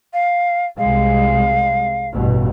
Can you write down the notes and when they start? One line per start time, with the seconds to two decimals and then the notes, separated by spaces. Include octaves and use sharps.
0.13 F5
0.78 C2 G#3 F5
2.12 A1 G2 B2